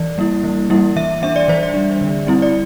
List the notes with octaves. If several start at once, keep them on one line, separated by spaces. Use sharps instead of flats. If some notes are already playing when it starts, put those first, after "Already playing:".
Already playing: E3 D5
G3 A#3 E4
E3
G3 A#3 E4
E3 E5
G3 D4 E5
D5
E3 C5
D5
G3 D4
D3
G3 C4 E4
D5